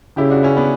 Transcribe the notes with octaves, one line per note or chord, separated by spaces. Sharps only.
C#3 E4 G4
D4 F#4
C#4 E4
B3 D4